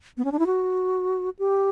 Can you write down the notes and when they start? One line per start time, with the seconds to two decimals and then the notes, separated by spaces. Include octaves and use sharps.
0.17 B3
0.24 C#4
0.32 D4
0.39 E4
0.46 F#4
1.39 G4